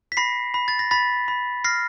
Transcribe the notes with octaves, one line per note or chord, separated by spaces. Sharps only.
B6
B5 A#6 C7
B5
A6
A#6
B5 A6 B6
B5
F6 A#6 C7